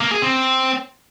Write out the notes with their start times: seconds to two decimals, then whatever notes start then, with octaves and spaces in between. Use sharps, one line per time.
0.01 A#3
0.11 G#4
0.22 C4